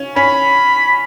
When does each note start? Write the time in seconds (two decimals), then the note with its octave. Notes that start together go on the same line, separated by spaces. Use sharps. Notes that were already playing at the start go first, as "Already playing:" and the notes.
Already playing: C#4
0.16 C#4 B5